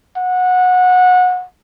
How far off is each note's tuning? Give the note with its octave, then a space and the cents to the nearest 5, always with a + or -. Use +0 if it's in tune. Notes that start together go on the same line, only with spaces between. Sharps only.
F#5 -20